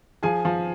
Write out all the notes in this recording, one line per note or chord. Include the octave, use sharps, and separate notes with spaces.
F3 G#4 G#5
F3